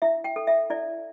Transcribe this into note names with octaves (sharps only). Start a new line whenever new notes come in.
E4 E5
G5
A4
E5
E4 D5